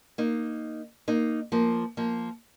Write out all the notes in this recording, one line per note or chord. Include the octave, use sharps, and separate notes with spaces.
A#3 D#4
A#3 D#4
F3 A#3
F3 A#3